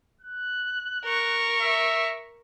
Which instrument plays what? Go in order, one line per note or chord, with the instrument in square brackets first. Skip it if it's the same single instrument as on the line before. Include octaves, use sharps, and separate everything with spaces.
[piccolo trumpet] F#6
[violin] A#4 C#6
[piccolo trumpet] E5